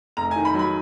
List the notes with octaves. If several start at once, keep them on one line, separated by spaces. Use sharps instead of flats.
F1 A#5
D#3 G#5
B5
F#3
B5